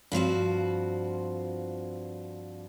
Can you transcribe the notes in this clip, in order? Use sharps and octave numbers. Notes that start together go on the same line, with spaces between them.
G2 F3 C4 F#4